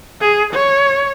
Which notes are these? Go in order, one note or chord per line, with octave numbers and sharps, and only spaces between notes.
G#4
C#5